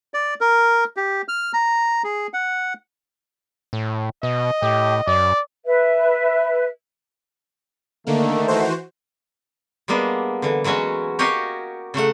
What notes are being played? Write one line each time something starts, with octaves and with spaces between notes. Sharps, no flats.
D5
A#4
G4
F6
A#5
G#4
F#5
A2
B2 D#5
A2 G4
F#2 D5
B4 E5
D3 D#3 A3 A#3
E3 F#4 C5
G3 G#3 A#3 B3 D4
D3 E3
E3 F#3 G#3 C#4 F#4
F#4 G4 A#4 C#5 D#5 F5
C#3 F#3 A3 F#5